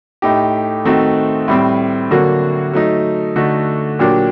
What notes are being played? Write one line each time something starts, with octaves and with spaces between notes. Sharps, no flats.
A2 A3 D#4 G4
D#3 A3 C4 D#4 F#4
A2 G3 C4
D3 F#3 A#3 F#4
F#3 A3 D#4
D3 A3 D#4 F#4
A#2 F#3 A#3 D4 G4